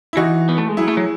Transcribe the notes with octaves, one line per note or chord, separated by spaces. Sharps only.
E4
E3 D#4 F#4
B3
A3
G#3
F#3 E4 G#4
A3
F#3